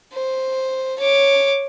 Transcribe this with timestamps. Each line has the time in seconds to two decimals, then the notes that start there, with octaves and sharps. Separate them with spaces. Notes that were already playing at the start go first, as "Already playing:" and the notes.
0.13 C5
0.99 C#5 D6